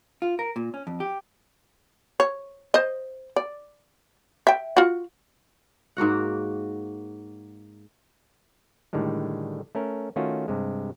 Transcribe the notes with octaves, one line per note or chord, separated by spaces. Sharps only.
F4
A#4
A#2
C#4
F2
G4
C#5
C5 D#5
D5
E5 G5
F4 F#4
G#2 A#3 F#4 F#5
A2 D3 D#3 G3 G#3
A3 C#4 A#4
D#3 A3 C#4 F4 F#4
G2 C3 G#3